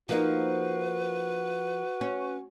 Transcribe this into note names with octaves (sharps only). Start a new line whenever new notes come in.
F3 A#3 D#4 F#4 B4
C#4